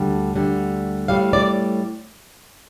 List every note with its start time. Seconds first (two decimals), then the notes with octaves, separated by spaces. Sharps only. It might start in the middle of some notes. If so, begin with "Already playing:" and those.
Already playing: D2 D3 G3
0.34 D2 D3 G3
1.08 A2 G3 F5
1.33 D5